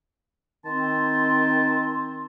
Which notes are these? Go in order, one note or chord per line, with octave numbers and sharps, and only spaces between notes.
D#3 C4 A5 C6